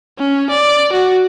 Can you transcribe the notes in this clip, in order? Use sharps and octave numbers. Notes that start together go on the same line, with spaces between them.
C#4
D5
F#4